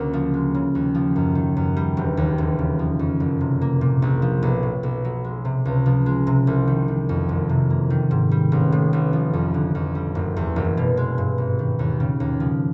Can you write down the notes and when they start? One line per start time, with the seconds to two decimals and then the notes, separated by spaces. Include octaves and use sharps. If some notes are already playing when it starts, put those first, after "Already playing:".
Already playing: D2 C#3 A#3
0.13 F3
0.34 G#3
0.55 C#3
0.75 D#2
0.95 F3
1.16 F#2
1.35 D#3
1.57 F#2
1.77 G3
1.97 E1
2.17 D#2
2.38 E1
2.59 C#3
2.79 F3
2.99 F2
3.20 F#1
3.41 C3
3.61 A#3
3.81 A#2
4.02 A#1
4.22 F3
4.43 B1
4.63 A2
4.83 B1
5.05 F#3
5.24 G#3
5.45 C3
5.66 C#2
5.86 F3
6.06 G#3
6.27 C3
6.47 C2
6.68 D#3
6.88 D#3
7.09 F2
7.29 F#1
7.49 C3
7.70 A#3
7.90 D#3
8.11 G#2
8.31 G3
8.52 A1
8.72 A2
8.93 A1
9.13 F3
9.33 F2
9.54 D3
9.75 F2
9.95 G3
10.15 F#1
10.37 E2
10.56 F#1
10.77 B2
10.97 G#3
11.18 G2
11.38 G#1
11.59 D#3
11.79 D#2
12.00 C#3
12.20 D#2
12.40 F3